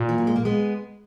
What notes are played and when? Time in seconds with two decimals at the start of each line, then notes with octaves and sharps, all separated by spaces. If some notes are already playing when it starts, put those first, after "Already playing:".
Already playing: A#2
0.09 E3
0.18 F#3
0.27 G#3
0.36 A#3
0.45 G#3 B3